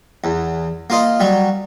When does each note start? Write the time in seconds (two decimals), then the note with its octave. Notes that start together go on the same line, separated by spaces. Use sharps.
0.24 E2
0.90 A#3 F4 D#5
1.20 F#3 G3